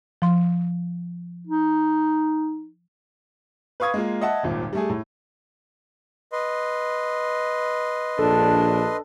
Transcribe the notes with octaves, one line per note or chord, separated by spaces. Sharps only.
F3 C6
D#4
B4 F5 C#6 D#6 G#6
G#3 A#3 F4
D#5 E5 F#5 A5
D#1 G#1 A#2
G3 A3 G#4
A2
B4 D#5 C6
A#1 D4 A4